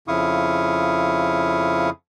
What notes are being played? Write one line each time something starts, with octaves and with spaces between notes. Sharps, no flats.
F2 C#3 E4 F5 C#6 D#6